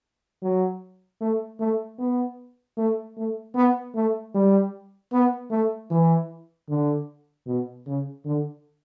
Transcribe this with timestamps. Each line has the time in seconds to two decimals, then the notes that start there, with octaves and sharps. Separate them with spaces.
0.42 F#3
1.21 A3
1.60 A3
1.98 B3
2.77 A3
3.17 A3
3.55 B3
3.95 A3
4.34 G3
5.12 B3
5.51 A3
5.91 E3
6.69 D3
7.46 B2
7.86 C#3
8.25 D3